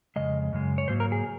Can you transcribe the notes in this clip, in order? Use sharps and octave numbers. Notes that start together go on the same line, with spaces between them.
F2 C#3 G#3 D#5
F#2 C#3 G#3
C#5
G#2 F#3 A#3 C5
A#4
G#4